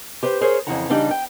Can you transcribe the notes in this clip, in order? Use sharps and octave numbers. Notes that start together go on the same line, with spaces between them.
G4 B4 C5
G#4 A#4 C5 C#5
F2 C#3 E3 E4 F#5 A#5
C#3 E3 G3 D4 D#4 G4
G5